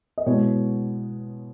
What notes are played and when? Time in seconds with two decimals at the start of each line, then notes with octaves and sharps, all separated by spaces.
0.18 D#5
0.26 B2 G#3 B3 E4 C#5